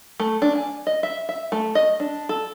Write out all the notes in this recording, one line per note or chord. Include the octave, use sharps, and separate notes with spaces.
A3
D4
G#5
D#5
E5
E5
A3
D#5
D4
A4